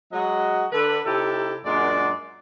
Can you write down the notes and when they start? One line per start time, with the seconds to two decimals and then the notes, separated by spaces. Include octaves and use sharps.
0.13 F#3 G#3 F#4 D#5
0.72 D3 D4 A4 B4
1.04 C3 D#4 E4 G4 A4
1.65 F#2 A#2 G#3 D4 F#4 D5